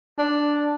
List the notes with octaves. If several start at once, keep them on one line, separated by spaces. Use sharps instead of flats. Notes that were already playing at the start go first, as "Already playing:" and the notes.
D4